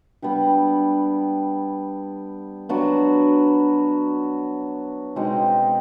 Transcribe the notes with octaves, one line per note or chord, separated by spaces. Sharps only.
G3 B3 D4 G4
F#3 B3 D4 F#4
B2 G#3 C4 D#4